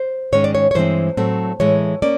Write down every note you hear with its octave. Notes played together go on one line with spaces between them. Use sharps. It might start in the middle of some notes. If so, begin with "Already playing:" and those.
Already playing: C5
G#2 D#3 G#3 C#4 C#5
D5
C#5
C#5
G2 E3 G#3 C4 C5
A2 F#3 A3 C4
A2 E3 G#3 C#5
A#3 C#4 D5